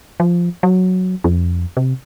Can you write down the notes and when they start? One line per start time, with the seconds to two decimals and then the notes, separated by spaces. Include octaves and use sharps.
0.20 F3
0.63 F#3
1.24 F2
1.77 C3